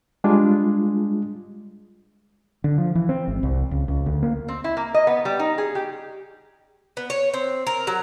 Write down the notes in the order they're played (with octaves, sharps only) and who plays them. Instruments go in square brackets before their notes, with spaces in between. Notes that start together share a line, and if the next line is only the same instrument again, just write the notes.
[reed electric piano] G3 G#3 D4 F4 G#4
[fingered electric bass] D3
F3
E3
C4
G#1
C2
C#2
C#2
D2
A#3
[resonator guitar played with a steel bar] C4
E4
A#3
D#5
B3
G3
D#4
G#4
G4
[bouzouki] B3
C#5
C4
A#4
F#3